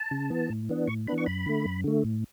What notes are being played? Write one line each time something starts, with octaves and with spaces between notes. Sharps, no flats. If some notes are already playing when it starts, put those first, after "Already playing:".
Already playing: A5
C#3
E3 B3
A2
E3 B3 D4
A2 C#6
E3 B3 D4 B5
C#6
F#2 B5
D3 A3
F#2
D3 A3
A2